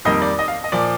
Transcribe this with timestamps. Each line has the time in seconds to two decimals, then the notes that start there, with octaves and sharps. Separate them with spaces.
0.05 F2 D#3 G3 A#3 D#5
0.22 D5
0.39 D#5
0.48 F5
0.64 D#5
0.72 A#2 F3 D5